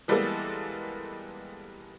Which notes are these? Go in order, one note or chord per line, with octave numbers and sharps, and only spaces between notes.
E3 G3 G#3 A#3 B3 A4